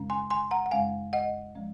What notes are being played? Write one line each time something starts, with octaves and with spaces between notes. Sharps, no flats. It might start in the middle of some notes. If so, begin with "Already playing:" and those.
Already playing: F#2 C#3 G#3 C#4
G#5 C6
G#5 C6
F#5 A#5
F#5
F#2 C#3 G#3 C#4 F5 G#5
D#5 F#5
F3 G#3 C#4